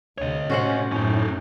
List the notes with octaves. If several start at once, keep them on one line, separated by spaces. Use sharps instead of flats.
D2 C3 C#5 D#5
A2 C3 C#4 F#4 C5 F#5
F#2 A2 C#4 D#4